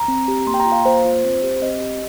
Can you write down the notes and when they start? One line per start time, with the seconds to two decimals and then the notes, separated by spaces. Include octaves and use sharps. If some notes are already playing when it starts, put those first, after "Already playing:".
Already playing: A#5
0.08 C4
0.28 G4
0.47 A#3 C6
0.54 G5
0.60 A#5
0.66 F4
0.72 F5
0.85 A#3 C5
1.05 F4
1.24 C4
1.43 G4
1.62 C4 D#5
1.81 G4